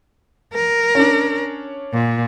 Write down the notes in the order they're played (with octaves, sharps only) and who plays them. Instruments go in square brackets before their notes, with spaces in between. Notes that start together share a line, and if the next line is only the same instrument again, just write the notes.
[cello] A#4
[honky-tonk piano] C#4 D4
[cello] A#2